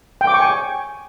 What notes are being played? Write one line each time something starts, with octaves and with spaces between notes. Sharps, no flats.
G5
D6
C#6
G#5
G5